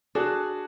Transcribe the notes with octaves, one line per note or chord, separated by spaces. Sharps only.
D4 F#4 G#4